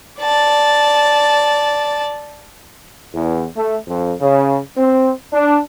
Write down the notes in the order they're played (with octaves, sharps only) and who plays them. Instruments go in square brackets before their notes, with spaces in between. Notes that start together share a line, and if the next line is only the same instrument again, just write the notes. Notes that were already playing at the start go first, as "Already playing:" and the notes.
[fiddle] D5 A5
[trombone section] E2
A3
F2
C#3
C4
D4